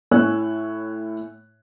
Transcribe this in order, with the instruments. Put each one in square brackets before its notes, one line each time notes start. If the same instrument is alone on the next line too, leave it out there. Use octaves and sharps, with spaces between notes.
[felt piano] A2 C#5 G#5 E6 F#6